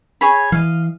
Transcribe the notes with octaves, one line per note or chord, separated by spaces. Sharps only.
G#4 C#5 B5
E3 D#5 F5